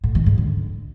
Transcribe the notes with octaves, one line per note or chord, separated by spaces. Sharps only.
A2
D#3
G#2
D3